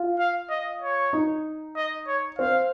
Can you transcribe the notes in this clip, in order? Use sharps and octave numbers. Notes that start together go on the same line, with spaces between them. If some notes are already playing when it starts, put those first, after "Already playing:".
Already playing: F4
F5
D#5
C#5
D#4
D#5
C#5
C4 F5